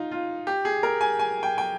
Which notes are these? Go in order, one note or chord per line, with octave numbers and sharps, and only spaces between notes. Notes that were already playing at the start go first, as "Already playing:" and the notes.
Already playing: D#4 F4
F4
G4
G#4
A#4
G#5
G#5
G5
G5